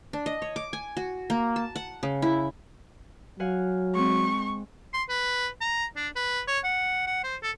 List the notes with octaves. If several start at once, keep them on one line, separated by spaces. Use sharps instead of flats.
D4
D#5
C#5
D6
G#5
F#4
A#3
A5
F#5
C#3
E4
F#3 F5 F#5 G#5
G#3 C4 C#6
C6
B4
A#5
D4
B4
C#5
F#5
F#5
C5
A4